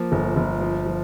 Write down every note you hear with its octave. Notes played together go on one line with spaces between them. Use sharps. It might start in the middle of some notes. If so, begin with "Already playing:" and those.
Already playing: F3 A#3
G1
G1
F3
F3